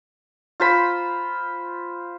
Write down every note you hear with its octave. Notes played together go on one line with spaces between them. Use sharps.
F4 C5 B5